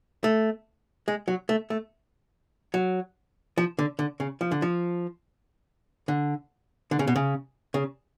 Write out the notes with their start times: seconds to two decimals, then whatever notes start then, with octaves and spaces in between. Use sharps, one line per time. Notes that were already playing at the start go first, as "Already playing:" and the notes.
0.24 A3
1.08 G#3
1.28 F#3
1.49 A3
1.70 A3
2.74 F#3
3.58 F3
3.79 D3
3.99 D3
4.20 C#3
4.41 F3
4.52 D3
4.62 F3
6.08 D3
6.91 D3
6.99 C#3
7.07 B2
7.16 C#3
7.74 C#3